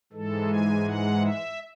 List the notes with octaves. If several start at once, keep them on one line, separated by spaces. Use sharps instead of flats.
G#2 E3 G#3 A4
G#5
F#5
E5